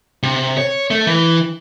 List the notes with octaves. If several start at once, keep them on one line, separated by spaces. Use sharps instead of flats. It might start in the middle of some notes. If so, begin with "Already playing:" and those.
C3
C#5
A3
E3